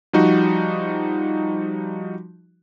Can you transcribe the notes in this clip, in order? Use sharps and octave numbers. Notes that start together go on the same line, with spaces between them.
F3 G3 D#4 F#4